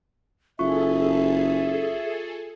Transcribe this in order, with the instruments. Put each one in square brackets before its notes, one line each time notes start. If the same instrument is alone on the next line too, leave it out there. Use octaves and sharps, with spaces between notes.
[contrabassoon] F#1 [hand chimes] F4 C#6 [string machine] G#4 A4 [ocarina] E5